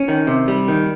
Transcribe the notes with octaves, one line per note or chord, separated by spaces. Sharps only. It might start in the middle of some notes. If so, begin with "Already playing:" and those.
Already playing: C#4
D#3
C3
G3
D#3